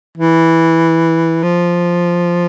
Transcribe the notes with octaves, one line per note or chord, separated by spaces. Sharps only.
E3
F3